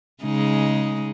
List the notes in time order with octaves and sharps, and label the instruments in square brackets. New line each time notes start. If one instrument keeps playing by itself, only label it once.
[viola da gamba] C#3 G#3 D#4